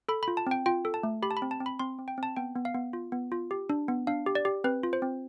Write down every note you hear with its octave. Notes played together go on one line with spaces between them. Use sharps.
A4 B5
B5
F4
A5
C4 G5
F4 G5
A4
A5
A3
G4 B5
A5
B5
C4
A5
C4
B5
C4 C6
C4
G5
C4
A5
B3 G5
B3
F5
B3
F4
B3
F4
G4
D4
B3
D4 F5
G4
D5
G4
C4 B4
F4
C5
C4